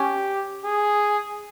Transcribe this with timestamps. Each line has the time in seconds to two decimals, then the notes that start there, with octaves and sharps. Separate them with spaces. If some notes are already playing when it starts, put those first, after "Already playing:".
Already playing: C#4 G4
0.64 G#4